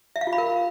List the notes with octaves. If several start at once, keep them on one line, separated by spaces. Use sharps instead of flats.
E5
F5
F4
B5
A#4